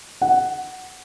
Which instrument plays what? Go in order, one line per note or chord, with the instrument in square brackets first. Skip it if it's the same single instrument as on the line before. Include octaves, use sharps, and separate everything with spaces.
[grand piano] F#5